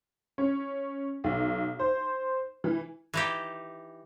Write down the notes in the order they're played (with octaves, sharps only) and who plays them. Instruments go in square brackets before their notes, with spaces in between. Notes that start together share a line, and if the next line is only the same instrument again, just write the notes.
[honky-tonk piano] C#4
B1
C5
E3
[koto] E3 D#4 G4